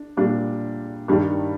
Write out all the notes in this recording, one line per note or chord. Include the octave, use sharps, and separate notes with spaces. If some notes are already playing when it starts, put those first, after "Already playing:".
Already playing: D4
A#2 G3 D4
G2 D#3 G3 D4